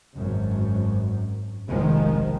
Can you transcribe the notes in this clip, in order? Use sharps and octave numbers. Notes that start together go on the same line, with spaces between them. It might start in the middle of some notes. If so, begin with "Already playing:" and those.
G#1 F#2
F1 A#1 D#3 F3 G#3